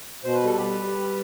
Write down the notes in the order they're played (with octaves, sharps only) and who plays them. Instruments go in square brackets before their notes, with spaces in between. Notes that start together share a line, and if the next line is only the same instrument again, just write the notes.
[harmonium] B2 C5
B4
G3 A4
G3 G4 B4
G3
G3